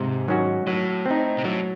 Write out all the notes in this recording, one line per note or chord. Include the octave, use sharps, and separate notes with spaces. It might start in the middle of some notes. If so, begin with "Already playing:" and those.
Already playing: G#2 C3
D#3 F#3 C#4 F#4
A2 F#3
C4
D#4
C3
A2 F#3